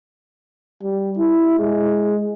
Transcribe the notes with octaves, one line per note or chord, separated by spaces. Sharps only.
G3
E4
G#3